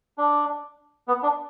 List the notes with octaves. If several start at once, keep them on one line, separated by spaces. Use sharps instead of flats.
D4
B3
D4